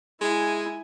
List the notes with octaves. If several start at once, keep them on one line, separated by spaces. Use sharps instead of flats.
G#3 E4 G#5